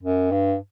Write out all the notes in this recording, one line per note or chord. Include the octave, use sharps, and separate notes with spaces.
F#2
G2